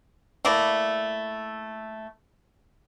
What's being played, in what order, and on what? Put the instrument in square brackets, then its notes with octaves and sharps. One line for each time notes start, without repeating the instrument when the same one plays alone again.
[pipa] A3 A#3 E4 D5